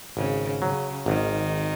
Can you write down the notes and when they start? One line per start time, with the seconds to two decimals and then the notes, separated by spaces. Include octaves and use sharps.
0.17 G#1 C#3
0.62 C#3 F#3
1.06 G#1 D#3